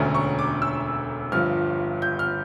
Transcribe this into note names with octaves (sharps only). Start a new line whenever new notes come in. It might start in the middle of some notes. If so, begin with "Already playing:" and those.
Already playing: E1 D2 D3 A3 C#4 A#5
C#6
D6
E6
G1 G2 F3 F6
G6
F6